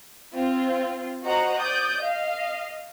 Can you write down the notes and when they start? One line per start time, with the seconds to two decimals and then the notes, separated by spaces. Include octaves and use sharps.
0.33 C4 F4
1.24 F#4 C5 D#5 F#5 A#5
1.58 D5 D#6 G6
1.99 D#5 F5